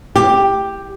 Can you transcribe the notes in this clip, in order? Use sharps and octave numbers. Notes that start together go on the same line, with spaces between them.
G4